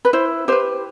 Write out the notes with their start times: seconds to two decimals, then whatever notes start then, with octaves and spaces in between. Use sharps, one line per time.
0.05 B4
0.13 E4 C5
0.48 G4 B4 C5